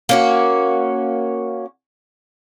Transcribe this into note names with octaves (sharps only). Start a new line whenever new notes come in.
A#3 C#4 F#4